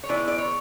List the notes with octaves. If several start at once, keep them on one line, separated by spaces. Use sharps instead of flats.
C#5
D#3 G#3 B3 E4 D5
D5
C#5